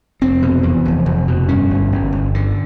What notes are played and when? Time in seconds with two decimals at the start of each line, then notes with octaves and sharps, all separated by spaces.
0.22 F1 C4
0.42 B2
0.63 E2
0.85 F1
1.06 F1
1.28 B2
1.48 G2 C#4
1.71 G1
1.92 G1
2.12 G1
2.34 D3